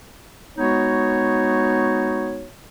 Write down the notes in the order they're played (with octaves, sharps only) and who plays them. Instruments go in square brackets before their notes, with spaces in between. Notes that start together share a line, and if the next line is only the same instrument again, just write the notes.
[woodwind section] G#3 B3 D#4 F#4 C#5